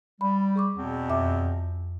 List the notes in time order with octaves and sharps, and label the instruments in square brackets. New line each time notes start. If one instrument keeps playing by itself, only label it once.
[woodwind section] G3 [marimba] B5
[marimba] G#4 C#6 D6
[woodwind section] E2 B2 C4
[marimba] F2 E5 D6